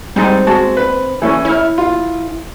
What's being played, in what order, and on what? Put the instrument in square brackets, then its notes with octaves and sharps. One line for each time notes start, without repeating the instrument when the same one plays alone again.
[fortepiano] G3 G#3 D#4 [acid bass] C4
[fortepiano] G#3 F#4 A5
B4
E3 A3 C#4
[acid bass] E4 [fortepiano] C#5 F6
[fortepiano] F4